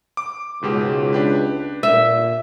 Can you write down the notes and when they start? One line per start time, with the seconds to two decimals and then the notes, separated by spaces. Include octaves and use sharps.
0.17 D6
0.62 C#2 G#2 B2 G4
1.12 D4 G4 B4
1.83 A#2 E5